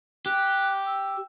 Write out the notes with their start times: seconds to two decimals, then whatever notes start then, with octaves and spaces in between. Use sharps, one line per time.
0.26 G4 F#6
0.86 E6